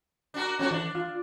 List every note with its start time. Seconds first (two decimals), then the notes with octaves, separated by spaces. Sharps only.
0.34 D4 F#4 A#4
0.59 F3 C#4 F#4 A4
0.71 E3 D4
0.95 F4